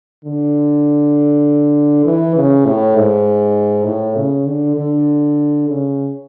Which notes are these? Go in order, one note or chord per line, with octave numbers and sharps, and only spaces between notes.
D3
E3
C#3
A2
G#2
A2
C#3
D3
D3
C#3